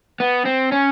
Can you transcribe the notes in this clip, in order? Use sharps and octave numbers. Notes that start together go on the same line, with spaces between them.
B3
C4
C#4